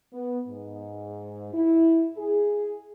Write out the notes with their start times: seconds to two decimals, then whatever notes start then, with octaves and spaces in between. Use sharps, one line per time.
0.13 B3
0.48 G#2
1.53 E4
2.18 G#4